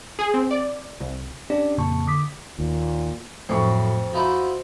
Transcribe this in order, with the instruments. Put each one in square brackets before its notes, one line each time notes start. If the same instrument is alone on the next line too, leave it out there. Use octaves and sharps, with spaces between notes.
[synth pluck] G#4
C4
D5
C2
[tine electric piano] C#4 D4 G4 D5
F2 A#2 C#3 A#3 A5 C#6
D3 D6 D#6 B6
[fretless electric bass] D#2 [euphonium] A#2
[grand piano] F2 C#6 [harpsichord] A2 [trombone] F#3 [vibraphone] C5
[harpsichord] F3 D#4 E4 [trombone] F#4